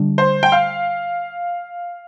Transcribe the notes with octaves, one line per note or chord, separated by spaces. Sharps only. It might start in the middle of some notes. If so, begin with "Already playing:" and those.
Already playing: D3 G3 D4
C5
G5
F5